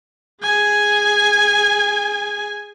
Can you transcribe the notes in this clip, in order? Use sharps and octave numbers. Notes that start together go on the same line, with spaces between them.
G#4 G#5